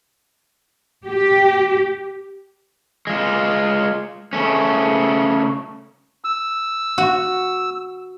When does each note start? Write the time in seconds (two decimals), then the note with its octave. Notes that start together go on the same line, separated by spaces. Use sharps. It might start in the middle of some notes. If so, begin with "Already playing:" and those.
1.06 G4
3.07 G#3 F4
4.33 C#3 A3 C#4
6.24 E6
6.98 F#4